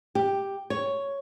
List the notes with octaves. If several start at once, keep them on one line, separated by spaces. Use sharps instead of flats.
G4
C#5